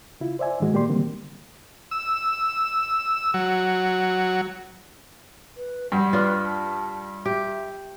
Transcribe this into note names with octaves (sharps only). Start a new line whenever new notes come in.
C#3 E4 F4
C5 D5 E5 G#5
G#2 D#3 E3 G#3 F#4
A#2 D#3 A#3 G4 D5 C6
D3 D#3 F#3 G3 A#3 C4
E6
F#3
B4
G2 G3 F#5
D4 F4 B4
A5
G4 E5